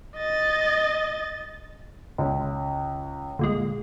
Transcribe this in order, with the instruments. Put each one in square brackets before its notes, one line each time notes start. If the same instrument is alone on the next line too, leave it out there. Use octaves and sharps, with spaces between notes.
[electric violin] D#5 A6
[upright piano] C#2
[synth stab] D2 A#2 G#3